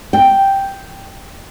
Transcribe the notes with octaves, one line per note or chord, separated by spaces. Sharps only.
G5